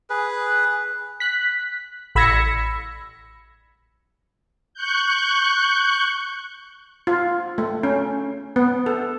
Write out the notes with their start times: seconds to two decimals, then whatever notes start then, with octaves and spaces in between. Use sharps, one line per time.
0.10 G#4 B4
1.20 F#6 B6
2.15 A1 B5 E6 G#6 A#6 C#7
4.74 C#6 F#6 G6
7.07 F4
7.58 A3
7.83 C#4
8.56 B3
8.86 A4